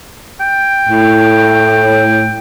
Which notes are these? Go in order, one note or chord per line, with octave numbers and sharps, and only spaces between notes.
G5
A2